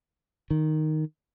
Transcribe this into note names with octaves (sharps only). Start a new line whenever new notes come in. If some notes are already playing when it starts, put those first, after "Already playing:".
D#3